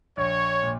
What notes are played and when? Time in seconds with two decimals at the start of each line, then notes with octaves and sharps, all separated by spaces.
0.17 A#1 C#5
0.63 A#2